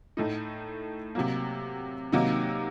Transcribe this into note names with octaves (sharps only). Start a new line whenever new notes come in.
A2 A3 D#4
C3 F#3 A#3
C3 D#3 F#3 A#3 D#4